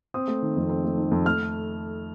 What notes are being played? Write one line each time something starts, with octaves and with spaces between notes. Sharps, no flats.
C4 D#6
A3
D#3
F2
C4
A3
D#3
F2
A3 F6